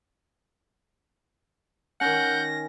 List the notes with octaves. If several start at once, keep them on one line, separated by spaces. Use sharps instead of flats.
D#3 C#4 A#4 F#5 G6 A#6